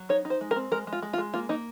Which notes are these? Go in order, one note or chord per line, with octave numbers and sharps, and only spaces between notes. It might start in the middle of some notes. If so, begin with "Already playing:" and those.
Already playing: F#3
D#4 C#5
D#4
C5
G#3
A#4
C4
G#3 A#4
G#3
F4
G#3
F4
G#3
A#3 F4
A#3 D#4